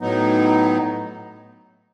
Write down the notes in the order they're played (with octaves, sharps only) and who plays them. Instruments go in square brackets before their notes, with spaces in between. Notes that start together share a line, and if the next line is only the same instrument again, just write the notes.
[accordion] A2 F#3 B3 D#4